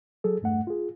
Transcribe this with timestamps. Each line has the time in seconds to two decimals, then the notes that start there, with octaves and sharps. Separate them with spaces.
0.24 F#3 G#4 A4
0.42 E2 G2 A3 F#5
0.67 F4 G#4